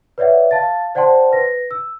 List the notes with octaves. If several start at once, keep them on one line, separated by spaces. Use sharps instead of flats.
B4 C#5 D5 E5 F#5
F5 A5 A6
C5 D5 F#5 G5 A5 C6
B4 A#6
E6